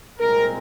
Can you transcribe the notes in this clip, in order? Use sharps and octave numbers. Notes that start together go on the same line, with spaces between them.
C2 A#2 G#3 C4 A#4